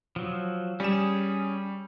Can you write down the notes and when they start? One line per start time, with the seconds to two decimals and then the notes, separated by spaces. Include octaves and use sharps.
0.16 F3 F#3
0.80 G3 C#4 G#4 E7